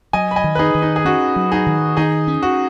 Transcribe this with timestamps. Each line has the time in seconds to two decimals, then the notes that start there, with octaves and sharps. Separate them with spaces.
0.13 F#3 D#5 G#5
0.31 B5
0.36 D#5 G#5
0.44 D#3
0.55 B4
0.59 D#4 G#4
0.75 D#3
0.82 D#4
0.96 G#4
1.05 C#4 F#4
1.36 F#3
1.52 D#4 G#4
1.66 D#3
1.97 D#3 D#4 G#4
2.28 C#4
2.43 F#4